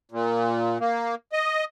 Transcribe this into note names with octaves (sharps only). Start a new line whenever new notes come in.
A#2
A#3
D#5